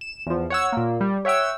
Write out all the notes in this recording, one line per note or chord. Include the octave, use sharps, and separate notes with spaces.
E7
E2 F3
C#5 F#5 E6
A#2 A#3
G3
C#5 E5 F#5 G5 E6